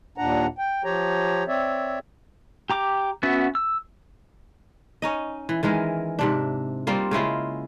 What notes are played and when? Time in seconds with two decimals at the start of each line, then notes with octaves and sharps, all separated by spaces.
0.18 D#2 A#2 D4 F#5 A#5
0.58 G5
0.84 F3 G4 C#5 A#5
1.48 C4 C#5 D5 E5
2.70 G4 A#5 D6
3.23 B3 C#4 F#4 E5
3.55 E6
5.02 C#4 D#4 D#5
5.49 E3
5.63 D#3 E3 G#3 A#4
6.19 G#2 C3 D4
6.87 G3 A#3 C4 F4
7.11 C#3 G#3 E4 F4